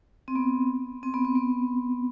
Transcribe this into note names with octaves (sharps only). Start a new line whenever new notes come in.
C4
B3
C4
B3
C4
B3